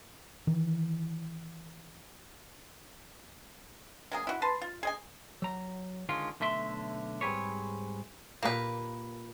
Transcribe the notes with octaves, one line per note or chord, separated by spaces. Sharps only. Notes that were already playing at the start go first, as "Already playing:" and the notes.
D#3 E3
F#3 A#3 G#4
E4 F#4
B4 A5 C6
F4
G#4 D#5 G#5
F#3 A#5
D3 D#3 G#3 C#4 F4
B1 D3 A3 E5 C6
G#2 G3 C4 G#4 B4 C#5
A#2 A#3 G4 A#4 B4